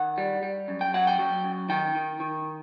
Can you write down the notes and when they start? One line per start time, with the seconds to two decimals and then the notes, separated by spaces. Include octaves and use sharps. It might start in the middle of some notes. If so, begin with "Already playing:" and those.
Already playing: D#3 F#5
0.18 G3
0.43 G3
0.68 F#2
0.81 G5
0.94 F#3 F#5
1.07 G5
1.19 F#3
1.44 F#2
1.69 D#3 G5
1.95 D#3
2.20 D#3